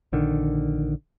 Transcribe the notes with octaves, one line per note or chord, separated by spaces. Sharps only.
A#1 D3 D#3